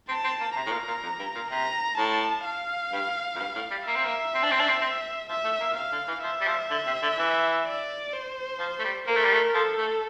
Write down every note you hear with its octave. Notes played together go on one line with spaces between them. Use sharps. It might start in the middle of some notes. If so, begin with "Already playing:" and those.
C4 A5
C4
A#3
C3 A#5
A2
A#2
A#2
F2
G2
A#2
C3 A#5
A2 A5
F5
G2
F2
G2
A2
G3
A#3 E5
C4
A#3
C4
D4
C4
D4
C4
C4
F3 E5
A3
A#3
A#2
C3 F5
D3
E3
F3 E5
G3
F3
D3
C3
D3
E3
D5
C5
F3
A3
G3
A#3 A#4
A3
G3
A3
F3 A4
A3